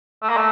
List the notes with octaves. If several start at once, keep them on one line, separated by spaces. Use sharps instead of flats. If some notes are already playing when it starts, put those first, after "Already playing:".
A3
A#3
A3